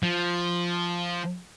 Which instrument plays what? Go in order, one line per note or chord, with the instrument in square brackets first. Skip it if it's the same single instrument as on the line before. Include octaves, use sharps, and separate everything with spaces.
[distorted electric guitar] F3